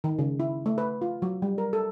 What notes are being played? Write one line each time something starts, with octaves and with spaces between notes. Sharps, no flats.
D#3
C#3
E4
A3
B4
F4
F#3
G3
A#4
A4